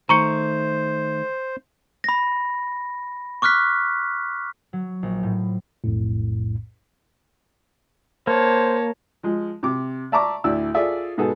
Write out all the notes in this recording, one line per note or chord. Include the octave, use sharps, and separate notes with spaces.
D#3 A3 C5 A#5 C#6 C#7
B5 A#6
C#6 D6 F6 F#6 B6
F#3
A#1
A2
B1 F2 A2
A#3 C5 C#5 A5
F3 G#3
C3 D6
D5 E5 A5 A#5 C#6 D6
D2 A2 E4 D5 E6
F4 G#4 A4 D5 E5
G#2 B2 B3 G#4 A4